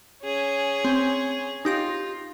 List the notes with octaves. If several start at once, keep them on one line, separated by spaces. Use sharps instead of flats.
C#4 G#4
C4
D#4 F4 G4 A#6